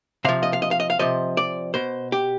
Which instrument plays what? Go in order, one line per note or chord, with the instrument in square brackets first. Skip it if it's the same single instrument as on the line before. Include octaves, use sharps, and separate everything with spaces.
[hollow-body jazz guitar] C3 F3 F5
D#5
F5
D#5
F5
D#5
F5
C3 F3 D#5
D5
B2 C5
G4